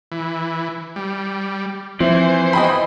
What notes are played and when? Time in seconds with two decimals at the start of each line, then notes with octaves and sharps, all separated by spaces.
0.12 E3
0.96 G3
2.00 E3 F3 C4 C5
2.53 D#5 G5 B5